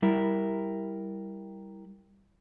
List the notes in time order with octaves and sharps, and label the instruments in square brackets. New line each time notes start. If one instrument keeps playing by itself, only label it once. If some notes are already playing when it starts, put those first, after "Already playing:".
[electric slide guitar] G3 E4 A#4